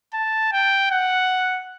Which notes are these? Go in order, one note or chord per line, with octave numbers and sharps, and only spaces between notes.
A5
G5
F#5